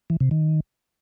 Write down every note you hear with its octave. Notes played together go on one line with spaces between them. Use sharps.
E3
C3
D#3